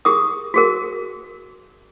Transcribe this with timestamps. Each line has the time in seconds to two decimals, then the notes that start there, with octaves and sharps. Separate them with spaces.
0.05 G4 G#4 A#4 D#6
0.54 F#4 G#4 A#4